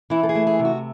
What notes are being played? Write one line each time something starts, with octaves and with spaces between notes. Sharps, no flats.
E3 E4
A4
G#4
A3
G#4
C3
F#4